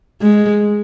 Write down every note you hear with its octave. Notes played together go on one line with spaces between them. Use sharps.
G#3